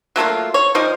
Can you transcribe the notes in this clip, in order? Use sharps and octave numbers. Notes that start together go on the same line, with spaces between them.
F#3 A3 A#3 F4
C#5
F3 G3 D#4 C5